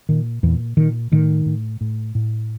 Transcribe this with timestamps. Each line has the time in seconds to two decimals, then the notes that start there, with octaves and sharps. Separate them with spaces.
0.09 A#2 D#3
0.43 E2 A#2 E3
0.77 A#2 D#3
1.12 A2 D#3
1.46 A2
1.81 A2
2.15 A2